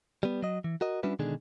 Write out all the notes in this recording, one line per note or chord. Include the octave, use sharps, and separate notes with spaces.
G3 B3
F#3 D#5
E3
F#4 A#4 D#5
G3 C#4 D4 E4 F#4 B4
B2 D3 D#3 G#3 D4 G#4